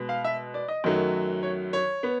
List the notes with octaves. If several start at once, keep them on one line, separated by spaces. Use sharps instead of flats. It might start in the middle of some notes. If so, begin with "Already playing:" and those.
Already playing: B2 G#3 B3
F5
E5
D5
D#5
F#2 D#3 F#3 A3
C#5
C#5
B3